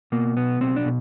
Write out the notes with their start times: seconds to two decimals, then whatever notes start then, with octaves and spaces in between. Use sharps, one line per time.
0.12 B2 A#3
0.37 B1 B3
0.60 B1 C4
0.76 D4
0.85 B2